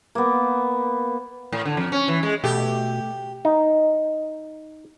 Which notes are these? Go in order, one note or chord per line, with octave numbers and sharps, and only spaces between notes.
A#3 B3
A2
D3
F2
C#4
E3
G#3
B2 A3 G4
D#4